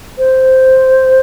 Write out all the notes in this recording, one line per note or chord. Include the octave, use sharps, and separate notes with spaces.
C5